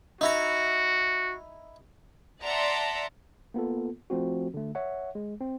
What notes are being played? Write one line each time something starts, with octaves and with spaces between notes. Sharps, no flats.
D#4 E4 F#4 A#5
D5 E5 F#5 A5 A#5 C6
A#3 B3 F4 A4
F3 A3 C4 F#4
D3 A3
C#5 E5 F#5
G#3
C4